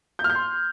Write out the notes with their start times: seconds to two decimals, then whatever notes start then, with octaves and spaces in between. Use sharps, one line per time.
0.19 G6
0.24 F6
0.30 G6
0.35 C6